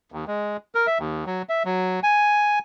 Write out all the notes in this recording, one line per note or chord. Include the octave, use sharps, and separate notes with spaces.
D#2
G#3
A#4
E5
D#2
F#3
E5
F#3
G#5